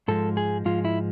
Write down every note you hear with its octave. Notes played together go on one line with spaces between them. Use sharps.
G#2 F3 G#3 A4
G#4
G#2 F3 G#3 F4
E4